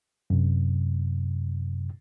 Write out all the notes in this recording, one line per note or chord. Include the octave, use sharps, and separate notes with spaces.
F#2 C3